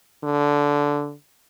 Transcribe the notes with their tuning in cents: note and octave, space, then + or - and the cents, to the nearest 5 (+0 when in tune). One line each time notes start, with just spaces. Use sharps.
D3 -10